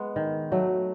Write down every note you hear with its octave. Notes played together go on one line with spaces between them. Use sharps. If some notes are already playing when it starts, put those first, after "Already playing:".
Already playing: G#3 B3
D#3
F#3 A3